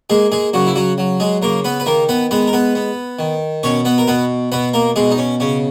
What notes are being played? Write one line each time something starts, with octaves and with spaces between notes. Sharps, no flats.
G#3 A#3 G#4
G#3 G#4
C#3 F#3 F#4
E4
F#3 F#4
F#3
G#3 G#4
C#3 A#3 A#4
B3 B4
B4
D#3 A#3 A#4
B3 B4
G#3 B3 B4
A#4
B3 B4
B3
D#3
B2 C#4 C#5
B3 B4
A#4
B2 B3 B4
B2 B3 B4
A#3 A#4
B2 G#3 G#4
D#4
C#4
C#3 C#4